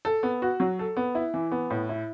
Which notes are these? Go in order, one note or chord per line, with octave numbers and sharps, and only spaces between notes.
A4
B3
F#4
F#3
A4
B3
E4
E3
B3
A2
E4